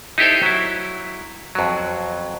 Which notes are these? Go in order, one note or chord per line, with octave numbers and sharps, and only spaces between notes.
D#4 E4 G4 A4 C5
F#3 E4
F2 F#3